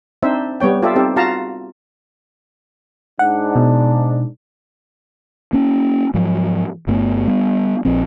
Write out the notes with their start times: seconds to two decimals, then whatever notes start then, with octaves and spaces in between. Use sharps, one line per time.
0.22 C4 D4 D#4 C5 E5
0.60 G3 B3 C#5 G5
0.82 F4 G4 A4 D5 E5
0.95 C4 D#4 G4 A4
1.16 F4 F#4 F5 A5 A#5
3.19 G#2 D4 F#5
3.56 B2
5.53 A#3 C#4
6.14 G#2 F3 F#3
6.87 G1 G2 A3 B3
7.28 G3 B3
7.85 A#1 F3 C4